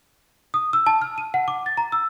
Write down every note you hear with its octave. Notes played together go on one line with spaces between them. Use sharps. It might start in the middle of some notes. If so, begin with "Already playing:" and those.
D#6
E6
A5
F6
D#7
F#5
D6
A6
A#5
E6